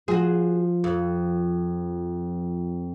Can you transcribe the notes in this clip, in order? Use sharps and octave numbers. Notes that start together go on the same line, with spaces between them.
F3 F#4 G#4
F2